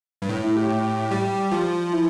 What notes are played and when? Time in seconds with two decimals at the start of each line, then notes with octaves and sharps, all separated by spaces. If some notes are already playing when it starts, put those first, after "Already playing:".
0.22 G2
0.29 A2
0.43 E4
0.56 G4
1.11 G3 G4
1.52 F3 F4
1.93 E4